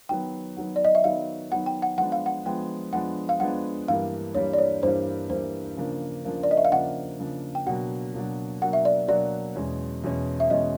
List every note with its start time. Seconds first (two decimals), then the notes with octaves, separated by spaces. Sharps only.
0.09 D#3 F#3 B3 G5
0.57 D#3 F#3 B3 F#5
0.76 D5
0.85 D#5
0.95 E5
1.04 D#3 F#3 B3 F5
1.51 D#3 F#3 B3 F#5
1.66 G5
1.82 F#5
1.98 F3 G#3 B3 D4 F#5
2.12 F5
2.26 F#5
2.45 F3 G#3 B3 D4 G5
2.93 F3 G#3 B3 D4 F#5
3.29 F5
3.40 F3 G#3 B3 D4 F#5
3.88 G2 E3 G3 A#3 F5
4.35 G2 E3 G3 A#3 C#5
4.53 D5
4.58 C#5
4.82 G2 E3 G3 A#3 C5
5.30 G2 E3 G3 A#3 C5
5.77 C#3 F3 A#3 D4
6.24 C#3 F3 A#3 D4
6.43 D5
6.51 D#5
6.57 E5
6.65 F5
6.71 C#3 F3 A#3 D4 F#5
7.19 C#3 F3 A#3 D4
7.55 G5
7.66 B2 F#3 A#3 D4 F#4 F#5
8.14 B2 F#3 A#3 D4 F#4
8.62 B2 F#3 A#3 D4 F#4 F#5
8.73 E5
8.85 D5
9.08 B2 F#3 A#3 D4 F#4 D5
9.56 E2 B2 G#3 C#4
10.04 E2 B2 G#3 C#4
10.40 E5
10.50 E2 B2 G#3 C#4 D#5